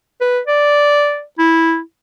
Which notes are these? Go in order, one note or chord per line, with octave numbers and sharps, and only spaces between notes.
B4
D5
E4